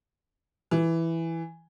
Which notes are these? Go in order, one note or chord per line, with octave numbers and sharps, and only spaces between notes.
E3